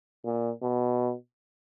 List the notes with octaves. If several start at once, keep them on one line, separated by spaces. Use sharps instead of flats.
A#2
B2